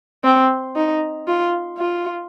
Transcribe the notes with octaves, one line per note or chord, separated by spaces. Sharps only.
C4
D#4
F4
F4